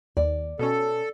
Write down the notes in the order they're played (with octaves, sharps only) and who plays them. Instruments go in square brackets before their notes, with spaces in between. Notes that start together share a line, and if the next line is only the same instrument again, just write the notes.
[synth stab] D#2 [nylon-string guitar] D5
[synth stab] B2 C#4 [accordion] A4